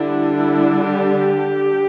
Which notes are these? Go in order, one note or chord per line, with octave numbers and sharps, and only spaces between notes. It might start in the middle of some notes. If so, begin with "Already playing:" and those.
Already playing: D3 G3 D4 E4
E4
G4